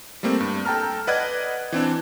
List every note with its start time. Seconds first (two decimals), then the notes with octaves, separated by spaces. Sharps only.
0.23 G3 A3 A#3 C4
0.40 G2
0.65 A4 G5 A5 A#5 F6
1.07 B4 D5 D#5 F#5 F#6 G#6
1.72 E3 C4 D4